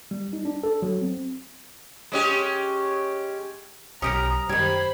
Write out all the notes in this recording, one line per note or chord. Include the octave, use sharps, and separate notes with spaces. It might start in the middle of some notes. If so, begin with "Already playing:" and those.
G3
D#4
D4
A4
F#3
C4
G#3 C#4 G4
B1 C#4 G4 A#4 A#5 D#6
F#2 D#3 G3 C5 B5 G#6